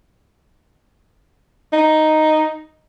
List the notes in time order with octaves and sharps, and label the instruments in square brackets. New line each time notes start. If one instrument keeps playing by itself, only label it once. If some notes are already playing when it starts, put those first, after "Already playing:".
[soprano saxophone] D#4